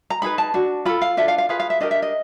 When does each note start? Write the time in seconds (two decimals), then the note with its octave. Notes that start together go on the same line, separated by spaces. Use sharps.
0.10 A#5
0.22 D#4 G#4 B4 B5
0.38 A5
0.54 D4 F#4
0.85 F4 A4 B5
1.02 F5
1.17 D4 F4 A4 E5
1.28 F5
1.38 F5
1.49 F4 G#4 B4 F5
1.60 F5
1.70 E5
1.81 D4 G4 A#4 D#5
1.91 E5
2.02 D#5